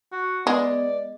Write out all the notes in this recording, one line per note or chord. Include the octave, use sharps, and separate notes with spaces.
F#4
G#3 B3 D5